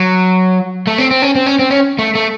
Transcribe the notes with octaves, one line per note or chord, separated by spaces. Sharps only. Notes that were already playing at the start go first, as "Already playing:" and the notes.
Already playing: F#3
A3
C4
C4
C#4
C4
C#4
C4
C#4
A3
A3